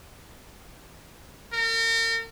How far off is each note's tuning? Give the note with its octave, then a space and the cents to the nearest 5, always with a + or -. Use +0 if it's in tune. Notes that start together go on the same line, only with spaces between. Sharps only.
A#4 -40